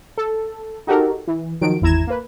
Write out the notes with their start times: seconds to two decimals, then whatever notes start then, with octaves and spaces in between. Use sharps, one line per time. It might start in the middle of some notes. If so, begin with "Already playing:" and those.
0.18 A4
0.87 D#4 F#4 G4 A4 A#4
1.28 E3
1.61 D#3 F3 F#3 D7
1.81 G#1 E2 E4 A#5 G#6 E7
2.07 A#3 B4